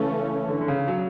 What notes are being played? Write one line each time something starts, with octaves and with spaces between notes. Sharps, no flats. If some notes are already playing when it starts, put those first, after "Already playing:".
Already playing: C#3 E3 A3 C#4
D3
D3
C#3
F#3